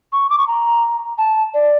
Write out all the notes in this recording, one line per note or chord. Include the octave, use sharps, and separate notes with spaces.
C#6
D6
C#6
A#5
A5
D5